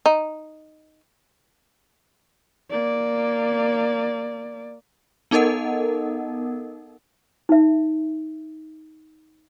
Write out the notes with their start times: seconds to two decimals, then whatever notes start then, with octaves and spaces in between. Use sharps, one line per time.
0.06 D#4
2.71 A#3 D5
5.31 B3 D#4 A4 A#4 D#5 F#5
7.49 D#4 E5